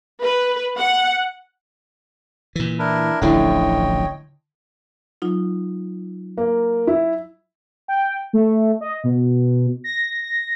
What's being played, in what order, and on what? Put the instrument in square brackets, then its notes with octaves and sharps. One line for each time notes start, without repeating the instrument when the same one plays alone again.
[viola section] B4
F#5
[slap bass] A#2 E3
[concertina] D4 E4 A#4
[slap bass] D1 A1 F3 [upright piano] D3 E4 [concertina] C#5 D#5 G5
[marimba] F#3 D#4 F4
[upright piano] A#3
E4
[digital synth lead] G5
A3
D#5
B2
A#6
A#6